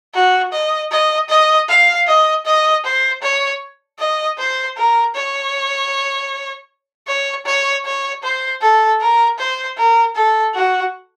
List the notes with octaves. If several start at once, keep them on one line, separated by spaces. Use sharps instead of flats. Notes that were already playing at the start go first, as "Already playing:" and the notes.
F#4
D#5
D#5
D#5
F5
D#5
D#5
C5
C#5
D#5
C5
A#4
C#5
C#5
C#5
C#5
C5
A4
A#4
C5
A#4
A4
F#4